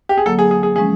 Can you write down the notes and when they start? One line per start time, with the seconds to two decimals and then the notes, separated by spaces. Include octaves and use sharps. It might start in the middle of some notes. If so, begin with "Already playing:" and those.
0.09 G4
0.18 G#4
0.26 D3 F#3 A#3 A4
0.39 G#4
0.51 G#4
0.63 G#4
0.76 F3 G#3 C#4 G#4